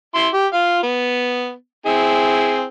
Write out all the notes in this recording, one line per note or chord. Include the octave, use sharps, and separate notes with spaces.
E4 C6
G4
F4 F5
B3
C4 E4 G#4